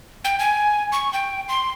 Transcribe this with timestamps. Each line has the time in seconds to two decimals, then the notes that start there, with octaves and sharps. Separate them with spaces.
0.25 G5
0.39 G#5
0.92 C#6
1.13 G5
1.49 C6